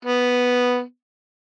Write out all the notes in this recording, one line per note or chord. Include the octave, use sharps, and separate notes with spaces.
B3